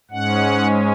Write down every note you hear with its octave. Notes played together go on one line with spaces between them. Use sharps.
G#2 G#3 C#4 F#5